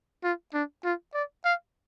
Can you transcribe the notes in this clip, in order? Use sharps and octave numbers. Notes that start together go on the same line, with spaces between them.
F4
D4
F4
D5
F5